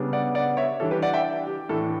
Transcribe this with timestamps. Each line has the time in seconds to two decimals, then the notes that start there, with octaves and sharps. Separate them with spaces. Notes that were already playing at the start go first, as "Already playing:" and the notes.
Already playing: C#3 G3 B3 D4
0.13 D5 F#5
0.35 D5 F#5
0.57 C#5 E5
0.80 E3 G3 D4 A4
0.91 G4 B4
1.02 D5 F#5
1.14 E5 G5
1.47 G4
1.69 A2 E3 A3 D4 A4